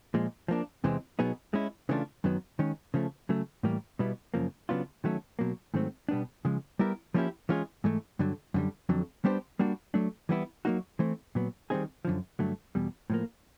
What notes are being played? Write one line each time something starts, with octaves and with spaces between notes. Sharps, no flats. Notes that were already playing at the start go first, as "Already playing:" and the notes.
A#2 F3 G#3
F3 A#3 D4
E2 C3 E3 G#3 C4
B2 F#3 B3 D#4 G#4
G#3 C#4 E4
C#3 E3 A3 D4 F4
F#2 D#3 F#3 B3
D#3 G#3 C#4
C#3 F3 A3
C#3 F#3 A3
A2 E3 G3 A#3
B2 G3 B3 E4
F#2 C#3 F3 A#3
C#3 F#3 B3 D4 F4
D#3 F#3 A3 C#4
B2 F#3 A#3
G#2 D#3 F#3 A3 C4
B2 G3 B3 D4
C#3 F3 G#3
G3 B3 E4 G4 A#4
F3 A#3 C#4 E4 G4
E3 G#3 C#4 F4 G#4
G#2 E3 A3
G2 D3 F#3
F#2 D3 G3
F2 D3 F#3
G3 B3 D4 G4 C5
G3 A#3 D4 F#4
F#3 A3 D4
E3 G3 B3 E4
F#3 A#3 D#4 F#4
E3 A3 C4
A#2 F#3 B3
D#3 G3 C4 D#4 G#4
F#2 D3 F3
G2 D3 F#3 A3
E2 B2 G3
A2 F3 A#3